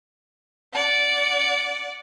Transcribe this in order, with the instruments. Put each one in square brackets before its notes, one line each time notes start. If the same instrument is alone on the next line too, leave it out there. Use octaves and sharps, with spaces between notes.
[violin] D5 F#5